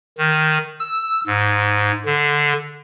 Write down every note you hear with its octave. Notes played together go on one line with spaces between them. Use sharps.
D#3
E6
G#2
D3